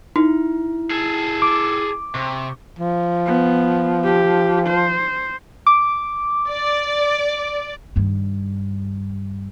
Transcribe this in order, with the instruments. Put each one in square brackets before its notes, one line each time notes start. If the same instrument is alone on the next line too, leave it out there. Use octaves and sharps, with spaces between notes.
[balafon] D#4 [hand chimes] E4
[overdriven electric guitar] G#4 A4
[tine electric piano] D6
[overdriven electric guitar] C3 [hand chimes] C#6
[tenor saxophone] F3
[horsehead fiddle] B3
G4
C5
[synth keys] D6
[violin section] D5
[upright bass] G2 D#3